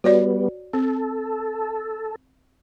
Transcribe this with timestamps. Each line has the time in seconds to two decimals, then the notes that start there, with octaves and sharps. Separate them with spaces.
0.04 G3 B3 F#4 C#5 D5
0.73 C4 A4